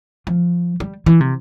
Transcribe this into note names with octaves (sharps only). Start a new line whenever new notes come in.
F3
G3
E3
C3